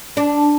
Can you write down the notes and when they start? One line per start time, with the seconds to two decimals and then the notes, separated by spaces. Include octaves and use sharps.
0.17 D4